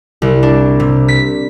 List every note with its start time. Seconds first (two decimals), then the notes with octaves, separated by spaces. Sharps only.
0.22 C2
0.43 D4
0.80 C3
1.08 B6